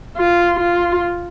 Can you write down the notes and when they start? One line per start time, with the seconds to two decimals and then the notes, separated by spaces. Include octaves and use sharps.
0.18 F4
0.60 F4